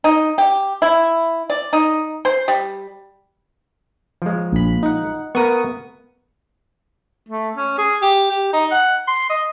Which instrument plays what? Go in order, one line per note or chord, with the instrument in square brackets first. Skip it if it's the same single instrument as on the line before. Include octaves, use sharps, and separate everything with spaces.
[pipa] D#4
G4
E4
D5
D#4
C5
G3
[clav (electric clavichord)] F3 G#3
[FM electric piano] A#1 B5
D#4 F#5
[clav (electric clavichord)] B3 A#4 [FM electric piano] C#6 D#6
[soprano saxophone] A3
C#4
G#4
G4
G4
D#4
F#5
C6
D#5